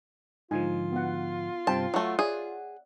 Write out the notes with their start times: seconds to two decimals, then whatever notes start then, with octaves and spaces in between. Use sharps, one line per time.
0.51 G#2 D3 F3 D#4 F4 G#5
0.92 B3 F#4 F#5
1.67 G2 C3 C5 G5 A5
1.94 F#3 A3 F#5
2.19 G#4 C#5 D5 E5